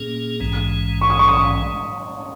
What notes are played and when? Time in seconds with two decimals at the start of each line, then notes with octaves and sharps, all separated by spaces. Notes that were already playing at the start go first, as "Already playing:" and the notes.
Already playing: A#2 A#3 C#4 G#4
0.40 A#1 G#2 E3 G#3 C#4
1.01 C#6
1.10 D#6
1.19 C#6
1.28 D#6
1.37 C#6